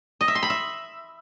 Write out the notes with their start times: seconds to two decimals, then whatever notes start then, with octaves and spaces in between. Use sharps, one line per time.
0.21 D#5
0.28 E5
0.35 C6
0.43 B5
0.50 E5